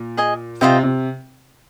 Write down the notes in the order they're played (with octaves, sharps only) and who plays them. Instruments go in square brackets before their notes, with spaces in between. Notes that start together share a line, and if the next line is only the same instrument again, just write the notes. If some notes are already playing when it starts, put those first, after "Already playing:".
Already playing: [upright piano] A#2
[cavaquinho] G#4 D#5 G#5
[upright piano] C3 [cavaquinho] F4 C5 D#5 G5
[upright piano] C3